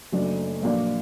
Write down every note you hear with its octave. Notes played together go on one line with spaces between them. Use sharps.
F#1 F#2 F#3 A3 D4
A#1 A#2 F#3 A#3 D4